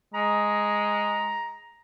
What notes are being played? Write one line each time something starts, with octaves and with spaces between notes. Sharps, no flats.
G#3 A#5